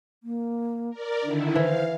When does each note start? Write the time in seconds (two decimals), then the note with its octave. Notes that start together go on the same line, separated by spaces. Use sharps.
0.23 A#3
0.90 A#4 D5
1.23 D3 D#3 D4 E4
1.56 E3 C5 F5